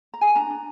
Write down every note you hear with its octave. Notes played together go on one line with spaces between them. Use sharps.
A#5
G#4 G#5
D4 A#5
D4